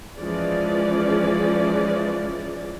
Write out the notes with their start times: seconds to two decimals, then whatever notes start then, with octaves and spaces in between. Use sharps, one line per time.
0.18 E3 F3 G#3 C#4 G#4 D5